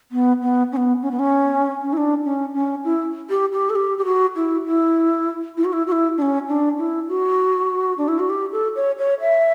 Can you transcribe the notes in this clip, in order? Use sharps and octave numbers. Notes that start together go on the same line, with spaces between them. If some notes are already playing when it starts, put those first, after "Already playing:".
B3
B3
C#4
B3
C#4
B3
C#4
C#4
E4
D4
C#4
C#4
E4
G4
G4
A4
G4
G4
F#4
E4
E4
E4
F#4
E4
F#4
E4
D4
C#4
D4
E4
F#4
D4
E4
F#4
G4
A4
C#5
C#5
E5